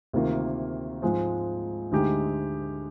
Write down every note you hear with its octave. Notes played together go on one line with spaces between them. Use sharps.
D2 C3 D#3 A#3 F4
G#2 F3 G#3 C4
D2 D3 G#3 D#4 G4